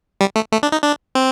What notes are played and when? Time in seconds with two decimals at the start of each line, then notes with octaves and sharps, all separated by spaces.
0.21 G3
0.36 A3
0.52 A3
0.63 D4
0.72 D#4
0.83 D4
1.15 C4